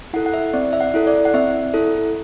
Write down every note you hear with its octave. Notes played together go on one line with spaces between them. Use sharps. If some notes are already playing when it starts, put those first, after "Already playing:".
E4 A4 F#5
F#5
E5
C4 D5
E5
F#5
E4 A4
D5
F#5
C4 E5
E4 A4